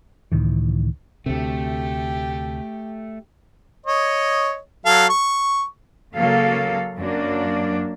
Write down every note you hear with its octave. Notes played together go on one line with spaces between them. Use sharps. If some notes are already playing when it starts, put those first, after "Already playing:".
C#2 A2 D#3 E3
D2 C3 A3 G4
C#5 D#5
F#3 A4 F5
C#6
C#3 F#3 A#3 A4 F5
F#2 F#3 A#3 D4